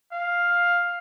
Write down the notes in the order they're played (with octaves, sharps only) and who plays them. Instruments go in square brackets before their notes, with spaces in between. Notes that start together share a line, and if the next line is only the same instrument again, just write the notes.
[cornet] F5